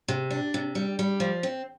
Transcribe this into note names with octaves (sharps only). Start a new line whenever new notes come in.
C3
D4
C3
G3
G3
F3
C4